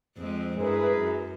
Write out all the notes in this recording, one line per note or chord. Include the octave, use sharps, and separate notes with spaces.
F2 G#3 C4
G2 E4 G#4 A#4 B4
F#2